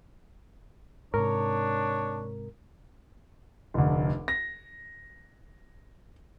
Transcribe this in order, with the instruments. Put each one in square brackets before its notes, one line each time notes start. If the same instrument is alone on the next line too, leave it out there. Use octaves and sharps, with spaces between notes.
[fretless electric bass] G#2 C3 [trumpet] D4 [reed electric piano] A#4 [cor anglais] C#5
[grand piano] F1 D2
A#6